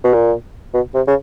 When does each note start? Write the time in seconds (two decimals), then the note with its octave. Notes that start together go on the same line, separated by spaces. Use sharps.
0.04 B2
0.14 A#2
0.74 B2
0.94 C3
1.07 C#3